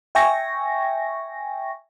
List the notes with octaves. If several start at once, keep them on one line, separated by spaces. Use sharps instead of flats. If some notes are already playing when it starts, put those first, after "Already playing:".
E5 G5 G#5 C#6 A#6